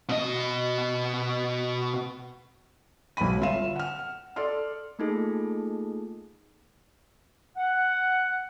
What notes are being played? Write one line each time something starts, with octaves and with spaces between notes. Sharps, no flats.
B2 D#5
B1 G#2 B4 B5 D#7
G1 F4 E5 F5 E7
F#5 F6
F#5
A4 D5 C6 F6
A3 A#3 D#4 F4 G#4 A4
F#5